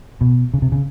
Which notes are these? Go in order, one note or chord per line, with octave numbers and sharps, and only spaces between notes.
B2
C#3
C3
C#3